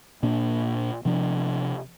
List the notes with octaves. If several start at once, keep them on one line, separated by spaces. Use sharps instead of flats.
A#2 A#3 D4
C3 F3 D4